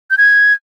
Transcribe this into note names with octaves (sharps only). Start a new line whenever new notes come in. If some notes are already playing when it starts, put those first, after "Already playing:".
G6
G#6